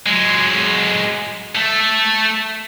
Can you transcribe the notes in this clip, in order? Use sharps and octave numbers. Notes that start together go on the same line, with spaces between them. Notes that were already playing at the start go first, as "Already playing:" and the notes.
F#3 G#3
A3 A4